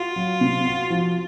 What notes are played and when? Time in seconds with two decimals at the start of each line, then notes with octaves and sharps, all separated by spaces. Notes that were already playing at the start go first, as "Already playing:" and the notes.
Already playing: F4 F#4
0.16 F#3
0.41 C3
0.66 F#4
0.90 F3